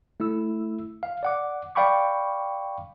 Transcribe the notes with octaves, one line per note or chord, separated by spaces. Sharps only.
A3 E4 E6
F5
D5 F#5 D6
D5 F5 G5 B5 C#6 D6